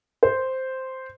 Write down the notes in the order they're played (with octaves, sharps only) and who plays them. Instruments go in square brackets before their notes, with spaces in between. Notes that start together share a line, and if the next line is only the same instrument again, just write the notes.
[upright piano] C5